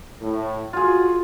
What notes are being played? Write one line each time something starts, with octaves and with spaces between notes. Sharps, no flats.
A2
F4 F#4 G#4